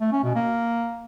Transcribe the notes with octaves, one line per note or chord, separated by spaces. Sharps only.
A3
C#4
B2
A#3